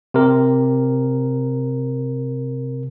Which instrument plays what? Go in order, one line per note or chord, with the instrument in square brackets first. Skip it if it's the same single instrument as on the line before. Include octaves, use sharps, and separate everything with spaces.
[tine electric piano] C3 A#4